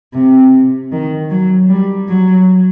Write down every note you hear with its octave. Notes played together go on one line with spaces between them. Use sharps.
C3
D#3
F#3
G3
F#3